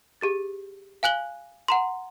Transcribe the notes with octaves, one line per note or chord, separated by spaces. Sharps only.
G4 G#4 A6
F5 G#5 F#6 F#7 G7
F#5 A#5 C6